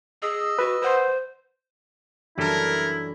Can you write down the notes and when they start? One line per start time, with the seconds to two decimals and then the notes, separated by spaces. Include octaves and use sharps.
0.22 G#4 D#5 E6
0.59 F#4 B4
0.82 B4 C5 F#5 C6
2.38 F#2 E3 G3 A3 D4 E4 A4 A#4